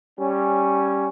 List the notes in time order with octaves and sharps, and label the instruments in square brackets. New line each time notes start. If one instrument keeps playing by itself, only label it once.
[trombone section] G3 C#4